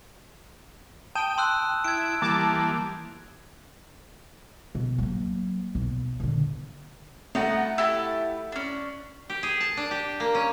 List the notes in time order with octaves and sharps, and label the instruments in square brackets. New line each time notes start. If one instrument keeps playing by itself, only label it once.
[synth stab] G5 [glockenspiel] A5 D#6 E7
[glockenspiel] C6 E6 F#6
[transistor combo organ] E4 [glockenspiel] G#6 D7
[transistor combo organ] E3 G3 A#3 [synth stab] A5 D6
[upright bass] B2
F#3 A#3
B1
A#2 D3
[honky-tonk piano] A3 F#5 [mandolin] B3 D#4 F#4
[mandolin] E4 G4 A5
C#4 D4
[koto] G4
G#4
A5
D4
G4
A#3
C#4